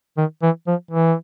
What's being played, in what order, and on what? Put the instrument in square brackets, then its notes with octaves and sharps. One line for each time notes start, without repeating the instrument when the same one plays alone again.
[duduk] D#3
E3
F3
E3